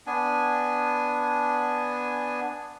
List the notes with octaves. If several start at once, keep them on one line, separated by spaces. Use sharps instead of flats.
B3 D4 G#5